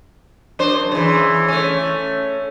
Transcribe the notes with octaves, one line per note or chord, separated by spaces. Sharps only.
F#2 D4 C5
C#3 E3
A3 C#4